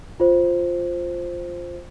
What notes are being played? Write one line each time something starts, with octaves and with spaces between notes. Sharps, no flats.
F4 C5